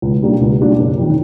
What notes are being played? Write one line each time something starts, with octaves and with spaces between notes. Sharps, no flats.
C#2
B2 G3 A#3 D4
C#2
B2 G3 A#3 D4
F#1
F2 C3 D#3